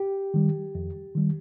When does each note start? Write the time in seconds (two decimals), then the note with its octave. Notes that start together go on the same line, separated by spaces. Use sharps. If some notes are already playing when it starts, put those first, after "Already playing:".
Already playing: G4
0.34 D#3 G3
0.75 F2
1.15 D#3 G3